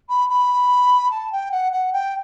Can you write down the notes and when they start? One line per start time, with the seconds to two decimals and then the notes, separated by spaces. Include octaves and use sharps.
0.09 B5
0.29 B5
1.10 A5
1.31 G5
1.51 F#5
1.72 F#5
1.92 G5